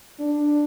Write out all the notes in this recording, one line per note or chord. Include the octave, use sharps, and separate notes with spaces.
D4